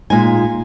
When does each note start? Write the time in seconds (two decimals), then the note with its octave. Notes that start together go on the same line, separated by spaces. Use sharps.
0.10 A#2 G#3 D#4 G#5